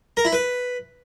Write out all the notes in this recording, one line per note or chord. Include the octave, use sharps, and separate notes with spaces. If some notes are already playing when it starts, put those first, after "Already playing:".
A#4
E4
B4